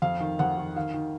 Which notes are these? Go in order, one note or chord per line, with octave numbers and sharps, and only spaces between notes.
F2 F5
D#3
F2 F#5
D#3
D#3 F5
D#3